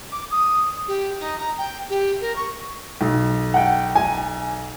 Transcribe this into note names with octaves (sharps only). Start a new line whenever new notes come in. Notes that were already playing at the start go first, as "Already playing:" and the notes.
D6
D#6
G4
D#4
A#5
G5
G4
A#4
C#6
B1
F#5 G5
G#5